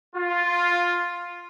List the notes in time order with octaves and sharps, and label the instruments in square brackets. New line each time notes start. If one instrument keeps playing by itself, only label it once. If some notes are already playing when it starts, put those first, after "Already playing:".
[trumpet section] F4